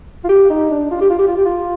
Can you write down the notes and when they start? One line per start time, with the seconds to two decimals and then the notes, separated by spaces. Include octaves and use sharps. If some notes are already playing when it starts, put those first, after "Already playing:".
0.25 F4
0.29 G4
0.50 D#4
0.71 D4
0.91 F4
1.01 G4
1.10 F4
1.19 G4
1.28 F4
1.37 G4
1.45 F4